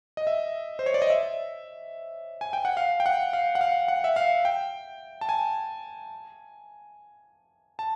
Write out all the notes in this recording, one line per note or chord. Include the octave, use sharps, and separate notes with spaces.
D#5
E5
C5
C#5
D5
D#5
E5
G#5
G5
F#5
F5
G5
F#5
F5
F#5
F5
F#5
E5
F5
G5
A5
G#5
A5